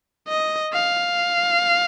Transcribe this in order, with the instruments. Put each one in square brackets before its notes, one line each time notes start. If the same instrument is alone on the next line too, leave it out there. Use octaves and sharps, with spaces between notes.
[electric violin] D#5
F5